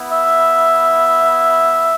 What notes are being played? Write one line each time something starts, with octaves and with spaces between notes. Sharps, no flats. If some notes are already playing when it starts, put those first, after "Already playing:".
Already playing: B3 E4
E5